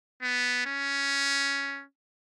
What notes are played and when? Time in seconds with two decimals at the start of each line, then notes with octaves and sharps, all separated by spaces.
0.22 B3
0.66 C#4